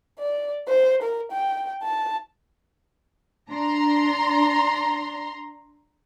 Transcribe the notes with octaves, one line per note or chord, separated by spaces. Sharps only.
D5
C5
A#4
G5
A5
D4 A#5 C6